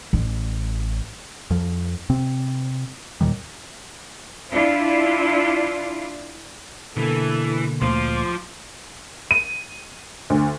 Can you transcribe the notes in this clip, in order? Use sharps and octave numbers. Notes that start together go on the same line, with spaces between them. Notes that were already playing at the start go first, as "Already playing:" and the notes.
A1
F2 F3
C3 C4
D#2 A#2 D#3 G3
D4 E4 F4
B2 D3 E3 A#3 A4
D2 A#2 F3 F4 C6 D6
D#7
D2